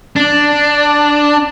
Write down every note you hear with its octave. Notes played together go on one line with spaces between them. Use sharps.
D4